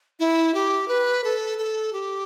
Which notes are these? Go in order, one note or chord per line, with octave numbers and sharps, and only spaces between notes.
E4
G4
B4
A4
A4
G4